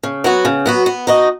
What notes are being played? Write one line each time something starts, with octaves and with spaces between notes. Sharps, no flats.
C#3
F#3 B3 F#4
C#3
F#3 B3 F#4
B3
D#4 F#4 D#5